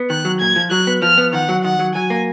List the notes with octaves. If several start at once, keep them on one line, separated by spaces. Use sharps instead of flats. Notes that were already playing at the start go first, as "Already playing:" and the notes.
Already playing: B3
D#3 F#6
F#3
A#2 G#6
F3
F#3 F#6
B3
F3 F6
B3
D#3 F#5
F#3
D#3 F#5
F#3
F#3 G#5
A#3